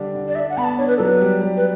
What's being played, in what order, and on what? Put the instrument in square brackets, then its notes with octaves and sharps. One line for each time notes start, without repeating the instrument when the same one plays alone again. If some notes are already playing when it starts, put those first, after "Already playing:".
Already playing: [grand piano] D3 G3 D4
D3
[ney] D5
[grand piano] D4 [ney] E5
[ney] F#5
[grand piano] B3 [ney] B5
[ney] A5
[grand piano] D4 [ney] C#5
[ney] B4
[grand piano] F#3 [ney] A4
[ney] B4
[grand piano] G3
G3
[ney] B4